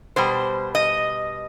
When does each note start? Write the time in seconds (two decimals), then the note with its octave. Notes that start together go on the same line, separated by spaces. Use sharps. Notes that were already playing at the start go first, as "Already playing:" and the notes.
0.16 B2 G3 C5
0.75 D#5